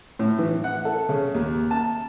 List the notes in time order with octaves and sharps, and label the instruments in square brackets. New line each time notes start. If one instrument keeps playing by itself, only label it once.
[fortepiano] A2
E3
F#5
A4
C#3
D#2
A5